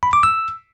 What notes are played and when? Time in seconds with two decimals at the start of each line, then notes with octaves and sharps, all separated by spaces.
0.03 B5
0.13 D6
0.23 E6